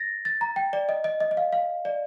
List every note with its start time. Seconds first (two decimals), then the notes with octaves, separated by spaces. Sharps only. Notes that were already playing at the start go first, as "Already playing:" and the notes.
Already playing: A6 A#6
0.25 A6
0.41 A#5
0.56 G5
0.73 D5
0.89 D#5
1.04 D#5
1.20 D#5
1.31 D#5
1.37 F5
1.53 F5
1.85 D5